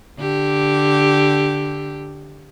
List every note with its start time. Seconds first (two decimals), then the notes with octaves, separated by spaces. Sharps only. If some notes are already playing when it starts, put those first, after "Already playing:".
0.19 D3 G4